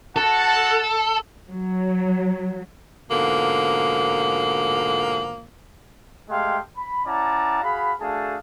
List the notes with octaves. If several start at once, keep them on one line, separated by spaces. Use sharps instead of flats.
F#4 A4 F#5 A5
F#3
G#2 B2 D3 F3 A#3
G#3 A3 G4 F5 G5 C6
B5
C#4 E4 D5 F#5 A5 A#5
F#4 G#4 F5 B5
A3 D4 F#4 G#4 F5 A5